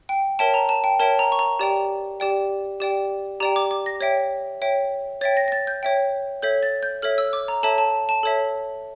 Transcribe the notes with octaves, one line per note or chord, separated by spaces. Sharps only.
G5
A#4 C#5 E5 G5 A5
A#5
A5
G5
A#4 C#5 E5 G5 A5
A#5
C#6
A#5
G4 D5 G5 A#5
G4 D5 G5
G4 D5 G5
G4 D5 G5 A#5
D6
D6
A#6
C#5 E5 G5
C#5 E5 G5
C#5 E5 G5 A6
A#6
A#6
A6
G6
C#5 E5 G5
A4 C#5 E5 G6
A6
G6
A4 C#5 E5 F6
E6
D6
A#5
A4 C#5 E5 A5
A5
A5
A4 C#5 E5